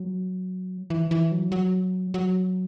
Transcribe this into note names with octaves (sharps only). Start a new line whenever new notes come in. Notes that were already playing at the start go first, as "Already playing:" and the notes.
Already playing: F#3
E3
E3
F#3
F#3
F#3